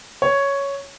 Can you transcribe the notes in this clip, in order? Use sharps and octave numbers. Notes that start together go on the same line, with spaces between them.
C#5